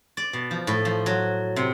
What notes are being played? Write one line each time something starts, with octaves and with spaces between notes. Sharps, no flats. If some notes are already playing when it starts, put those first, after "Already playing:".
D5
B2
F3
A2
F3
F#3
C3